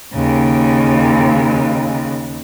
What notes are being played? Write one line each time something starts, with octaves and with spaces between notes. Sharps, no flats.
D#2 C#3